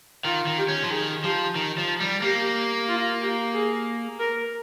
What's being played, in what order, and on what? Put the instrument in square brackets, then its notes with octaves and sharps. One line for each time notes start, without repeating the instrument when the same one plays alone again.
[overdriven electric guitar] D#3 [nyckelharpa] F4
[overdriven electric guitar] D#3
[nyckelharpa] G4
[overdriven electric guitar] C#4
F3
[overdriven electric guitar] D#3 [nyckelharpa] G#4
[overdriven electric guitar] F3 [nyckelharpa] G4
[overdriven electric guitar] D#3
F3
G3
[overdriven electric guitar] A#3 [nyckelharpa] G4
[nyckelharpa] F4
G4
G#4
A#4